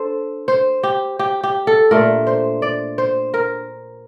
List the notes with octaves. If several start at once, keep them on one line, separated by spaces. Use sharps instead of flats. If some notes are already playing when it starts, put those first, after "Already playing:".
Already playing: D4 A4 C5
C5
G4
G4
G4
A4
A#2 A3 D4 A#4
C5
D5
C5
A#4